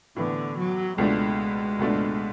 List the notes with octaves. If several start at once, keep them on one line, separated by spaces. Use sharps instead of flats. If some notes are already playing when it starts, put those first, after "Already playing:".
A2 D3 E3 B3
F#3
C#2 B2 G#3 A3 D4
C#2 B2 A3 D4